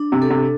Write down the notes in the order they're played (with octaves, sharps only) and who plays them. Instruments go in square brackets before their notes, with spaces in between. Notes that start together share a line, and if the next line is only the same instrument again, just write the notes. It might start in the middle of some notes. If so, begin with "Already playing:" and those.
Already playing: [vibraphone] D4
[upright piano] C3
[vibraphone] A4
[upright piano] C3